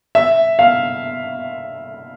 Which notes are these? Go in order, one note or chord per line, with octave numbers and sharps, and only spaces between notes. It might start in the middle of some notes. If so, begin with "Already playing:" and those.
E5
F5